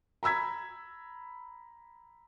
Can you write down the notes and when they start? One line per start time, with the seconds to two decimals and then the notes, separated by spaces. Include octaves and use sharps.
0.23 A#5 B5 E6 G#6 B6